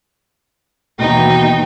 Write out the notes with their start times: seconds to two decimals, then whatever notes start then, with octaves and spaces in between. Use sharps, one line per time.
0.99 D#2 B2 E3 D#4 G5